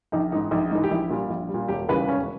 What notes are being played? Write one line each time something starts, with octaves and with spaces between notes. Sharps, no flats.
A#1 D#4
G#2 E3 D#4
A#1 D#4
G#2 E3 D#4
G4
A#1 E4
A#2 G3
A#1
G3
A#2
E1 G4
D#2 C#3 E3 G3 B4
E1 C#4